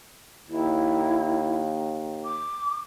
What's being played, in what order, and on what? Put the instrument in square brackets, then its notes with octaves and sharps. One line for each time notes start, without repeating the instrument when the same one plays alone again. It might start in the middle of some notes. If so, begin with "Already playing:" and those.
[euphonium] D#2 [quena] E4
[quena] D6